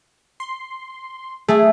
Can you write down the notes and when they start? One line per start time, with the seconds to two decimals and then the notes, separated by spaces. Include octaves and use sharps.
0.40 C6
1.48 A3 G#4